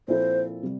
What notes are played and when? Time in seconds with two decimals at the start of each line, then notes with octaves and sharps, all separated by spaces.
0.08 A#2 F3 C4 E4 A4 C5
0.63 C3 G3